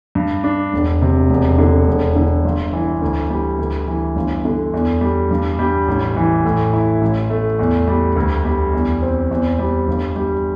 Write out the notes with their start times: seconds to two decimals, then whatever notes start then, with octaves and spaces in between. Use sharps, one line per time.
0.15 G2
0.44 D4
0.73 E1
1.02 C3
1.30 E1
1.59 D3
1.88 E1
2.16 D3
2.45 G1
2.73 E3
3.02 D2
3.30 G3
3.59 D2
3.87 E3
4.16 G1
4.45 D3
4.74 E2
5.01 G3
5.31 G2
5.59 G3
5.88 A1
6.16 E3
6.45 A2
6.73 E4
7.01 A1
7.30 A3
7.59 E2
7.88 G3
8.16 D2
8.45 G3
8.73 E2
9.02 C4
9.31 E2
9.59 G3
9.88 G1
10.16 G3